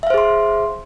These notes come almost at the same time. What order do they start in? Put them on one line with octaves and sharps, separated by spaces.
E5 F5 C5 G#4 C6